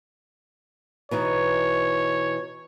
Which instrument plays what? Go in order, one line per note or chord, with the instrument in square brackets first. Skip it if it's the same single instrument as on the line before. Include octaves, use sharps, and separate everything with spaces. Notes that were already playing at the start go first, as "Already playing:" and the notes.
[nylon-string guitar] B2 E3 D#4 [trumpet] C#5